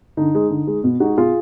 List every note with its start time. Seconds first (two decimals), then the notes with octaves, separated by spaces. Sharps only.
0.17 D3 D#4
0.35 G#3
0.50 D3
0.67 G#3
0.84 B2
1.00 G#3 D#4 F#4
1.17 B2 F4 G#4